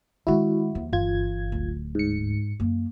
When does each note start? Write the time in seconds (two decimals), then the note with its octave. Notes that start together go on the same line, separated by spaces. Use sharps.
0.27 D#3 G#3 E4 F#4
0.75 D#2 F3
0.93 G1 E3 F4 G#6
1.52 D1
1.95 G#2 C#7
2.60 F#2 A#3